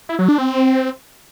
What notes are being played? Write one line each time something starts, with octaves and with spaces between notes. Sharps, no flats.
E4
F#3
D4
C4